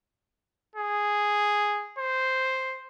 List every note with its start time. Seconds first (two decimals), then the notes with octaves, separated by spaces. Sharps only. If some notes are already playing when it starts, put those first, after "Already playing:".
0.75 G#4
1.98 C5